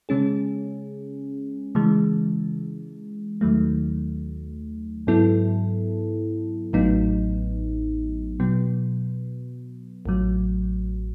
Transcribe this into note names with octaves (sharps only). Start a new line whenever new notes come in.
C#3 G#3 C#4 G#4
C#3 E3 G#3
D#2 D#3 F#3 A3
G#2 F#3 B3 E4 A4
A1 A2 F#3 B3 D#4
B2 F#3 B3
A1 A2 F#3